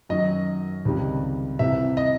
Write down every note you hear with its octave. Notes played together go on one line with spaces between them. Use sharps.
F#2 D#3 F#3 D#5
C#2 C3 D#3 G3
C2 C3 E3 E5
D#5